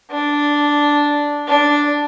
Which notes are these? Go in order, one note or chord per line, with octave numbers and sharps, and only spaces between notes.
D4
D4